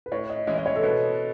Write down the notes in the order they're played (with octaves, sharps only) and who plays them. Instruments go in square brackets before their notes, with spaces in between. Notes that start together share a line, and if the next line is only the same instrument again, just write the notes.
[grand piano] B4
[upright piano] A2 [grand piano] C#5
[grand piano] D#5
[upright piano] E3 G#3 C#4 E4 [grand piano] D#5
[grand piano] D#5
C#5
A4
[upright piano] B2 [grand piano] B4